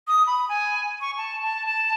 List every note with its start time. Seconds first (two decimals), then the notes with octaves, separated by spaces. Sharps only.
0.08 D#6
0.27 B5
0.49 G#5
1.01 C#6
1.18 A5
1.43 A5
1.66 A5